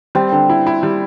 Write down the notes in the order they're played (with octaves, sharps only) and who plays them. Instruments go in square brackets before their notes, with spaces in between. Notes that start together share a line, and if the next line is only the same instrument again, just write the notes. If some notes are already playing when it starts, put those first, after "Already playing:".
[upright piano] G3 [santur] C4
[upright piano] D3
E4
E4
G3